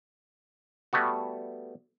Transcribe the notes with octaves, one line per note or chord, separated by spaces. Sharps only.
G3 A3 B3 F#4